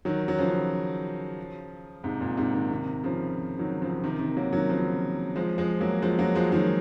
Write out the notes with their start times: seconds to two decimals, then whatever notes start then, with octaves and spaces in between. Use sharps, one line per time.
0.05 D#3 F#3
0.28 F#3
0.38 C#3 F3
2.04 G#2 C3
2.21 A#2
2.37 G#2 C3
2.54 C3 D#3
2.70 C3 D#3
3.03 C#3 F3
3.59 D#3 F#3
3.81 C#3 F3
4.03 C3 D#3
4.19 C3 D#3
4.37 F#3 A#3
4.53 D#3 F#3
4.69 C#3 F3
5.36 F3 G#3
5.58 F3 G#3
5.81 F#3 A#3
6.02 F3 G#3
6.18 F#3 A#3
6.35 F3 G#3
6.52 D#3 F#3